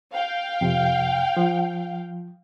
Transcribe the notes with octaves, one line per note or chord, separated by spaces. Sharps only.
F5 G5
F2 C3
F3